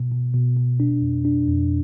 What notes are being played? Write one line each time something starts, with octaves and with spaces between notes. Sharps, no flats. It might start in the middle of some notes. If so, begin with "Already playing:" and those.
Already playing: B2
B2
B2
B2
D4
F2
D4
F2